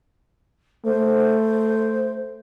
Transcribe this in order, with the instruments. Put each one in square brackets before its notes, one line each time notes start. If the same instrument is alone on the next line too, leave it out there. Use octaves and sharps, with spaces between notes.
[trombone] A3 [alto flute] C5